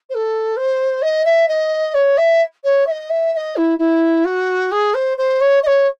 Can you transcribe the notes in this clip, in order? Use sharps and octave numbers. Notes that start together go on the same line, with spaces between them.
C5
A4
C5
D#5
E5
D#5
C#5
E5
C#5
E5
D#5
E5
E5
D#5
E4
E4
F#4
G#4
C5
C5
C#5
D#5
C#5